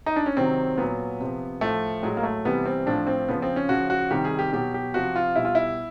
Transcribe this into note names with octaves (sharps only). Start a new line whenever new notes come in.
D#4
D4
C#4
C3 D#3 F#3 C4
A#2 F#3 B3
C3 F3
A2 F3 A3
A2 F#3 G#3
A#3
A3
C3 E3 G3 B3
C4
A2 F3 D4
C4
C#3 F3 B3
C4
C#4
C#3 F3 F#4
F#4
C3 D#3 G3 G4
G#4
G4
B2 F#3 G4
G4
C3 F3 F#4
F4
B2 G3 E4
F4
E4